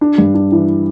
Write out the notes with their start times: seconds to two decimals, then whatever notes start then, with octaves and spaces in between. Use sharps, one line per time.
0.01 D4
0.18 G2
0.34 D4
0.52 E3